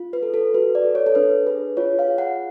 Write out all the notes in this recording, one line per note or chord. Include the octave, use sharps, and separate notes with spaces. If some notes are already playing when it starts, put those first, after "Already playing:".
Already playing: F4
B4
A4
A4
F#4 B4
D5
A4
C#5
A4
D4 B4
G#4 B4
F4 C#5
F5
G#4
F#5